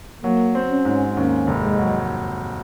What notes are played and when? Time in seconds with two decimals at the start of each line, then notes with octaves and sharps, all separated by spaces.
0.23 F#3 A#3
0.55 C4
0.70 C#4
0.85 G#2
1.16 D#2 C#4
1.47 F1
1.63 G#3
1.79 F#3